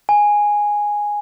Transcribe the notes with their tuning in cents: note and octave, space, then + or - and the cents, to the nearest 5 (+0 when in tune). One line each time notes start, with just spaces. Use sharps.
G#5 -5